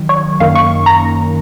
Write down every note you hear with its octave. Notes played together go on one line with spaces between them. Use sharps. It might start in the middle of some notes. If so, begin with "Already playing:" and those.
Already playing: D#3 F#3
C#5
F#2 D#3 A#3 C#4 F5
C#6
A#5